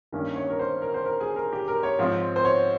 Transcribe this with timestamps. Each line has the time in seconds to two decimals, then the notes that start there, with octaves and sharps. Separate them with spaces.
0.12 G2 D#3 A#3 C#4
0.36 C#5
0.50 A#4
0.59 C5
0.82 A#4
0.94 C5
1.05 A#4
1.20 G#4
1.36 A#4
1.53 G4
1.68 A#4
1.83 C#5
1.99 G#2 F3 C4
2.36 C5
2.45 C#5